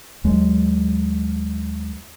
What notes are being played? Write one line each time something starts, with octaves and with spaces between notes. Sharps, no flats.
D#2 F#3 G#3